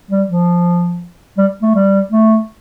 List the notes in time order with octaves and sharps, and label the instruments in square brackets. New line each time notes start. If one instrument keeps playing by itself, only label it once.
[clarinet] G3
F3
G3
A3
G3
A3